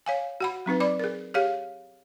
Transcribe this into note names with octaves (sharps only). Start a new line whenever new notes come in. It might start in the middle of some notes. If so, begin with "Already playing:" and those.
C#5 F5 G#5
F#4 F#5 B5
F#3 C4 D#4 B4
D5 B5 D6
G#4 A#4
G4 G#4 C#5 F5